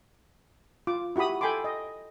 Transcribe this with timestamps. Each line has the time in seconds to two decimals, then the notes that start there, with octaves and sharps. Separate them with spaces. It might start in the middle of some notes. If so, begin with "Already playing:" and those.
0.87 F4 D6
1.16 E4 F#4 G4 B5 D#6
1.41 A4 G5 G#5 B5 C6 D6
1.64 D#5